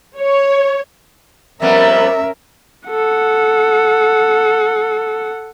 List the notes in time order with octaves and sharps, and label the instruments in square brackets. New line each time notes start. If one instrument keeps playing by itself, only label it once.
[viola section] C#5
[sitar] F2 G3 B3 [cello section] C#4 A#4 [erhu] E5
[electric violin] A4 F#5